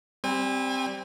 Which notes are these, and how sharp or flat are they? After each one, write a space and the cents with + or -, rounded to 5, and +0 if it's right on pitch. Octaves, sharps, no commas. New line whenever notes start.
G3 +0 C4 +0 G#5 -35